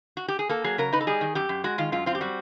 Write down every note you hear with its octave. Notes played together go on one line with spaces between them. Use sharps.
F#4
G4
G#4
A#3 A4
F#3 G#4
C#3 A#4
D#4 B4
A4
G3 G#4
D#3
F#2 G4
F#2
G#3 F#4
D#3 F4
F#2 F4
C4 F4
G4
G3 F#4